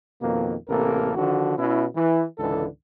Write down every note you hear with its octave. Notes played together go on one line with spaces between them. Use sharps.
F2 B2 D#3 A#3
A1 C3 A#3 A4 A#4
D3 D#3 F3 F#4
B2 C#4 E4
E3
C#2 G#2 D3 E3 A4